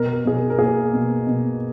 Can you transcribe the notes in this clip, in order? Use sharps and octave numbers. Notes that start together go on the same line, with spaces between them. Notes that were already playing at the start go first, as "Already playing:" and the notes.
Already playing: B2 A#4
A#4
B2 G#4
A#4
A#4
A#3 G#4
B2
B2